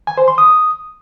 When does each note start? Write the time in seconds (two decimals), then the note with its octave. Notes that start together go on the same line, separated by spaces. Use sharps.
0.07 G#5
0.18 C5
0.28 C6
0.38 D#6